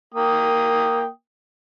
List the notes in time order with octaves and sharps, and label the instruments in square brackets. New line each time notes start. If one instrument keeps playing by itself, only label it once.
[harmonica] A#3 G5 D#6